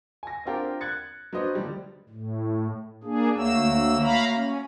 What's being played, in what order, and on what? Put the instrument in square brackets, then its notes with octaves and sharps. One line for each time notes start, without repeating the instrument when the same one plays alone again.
[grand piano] G#5 A#6
C4 D4 F4 G4 A#4
F#6 G#6 A6 C#7
F#3 D4 B4 C5 D#5
D3 F3 G3 A3
[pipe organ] A2
A#3 D4 G#4
[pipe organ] D2 E6 [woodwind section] F#3 A3 A#3
[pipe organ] F5 A#5 B5
C#4